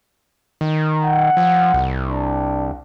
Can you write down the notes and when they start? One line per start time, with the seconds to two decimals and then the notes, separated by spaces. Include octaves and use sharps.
0.61 D#3
1.03 F#5
1.37 F3
1.74 C2
2.06 D4